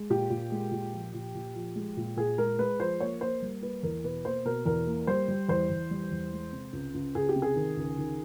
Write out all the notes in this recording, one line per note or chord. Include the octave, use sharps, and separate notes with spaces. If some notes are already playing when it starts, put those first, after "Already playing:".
Already playing: G#3
A#2 G4
A#2
G#3
A#2
F3
A#2
A#2
F3
G#3
A#2
A#2 G#4
G#3 A#4
G#3 B4
F3 C5
A#3 C#5
A#3 C5
G3
A#3 B4
E2 A#4
B2 B4
A#3 C5
B2 A#4
E2 A#4
A#3
G3 C5
G3
E2 C5
E2
G3
E2
G#3
C3
C#2
C#2
C#2 G#4
G4
C3
G#4
D#3
C#2
D#3